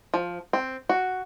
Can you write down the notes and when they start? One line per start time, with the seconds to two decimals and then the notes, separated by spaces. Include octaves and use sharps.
0.14 F3
0.53 C4
0.89 F#4